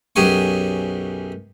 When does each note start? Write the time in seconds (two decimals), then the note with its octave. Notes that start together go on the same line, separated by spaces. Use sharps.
0.16 B1 F#2 G4 G#4 G#5 C#6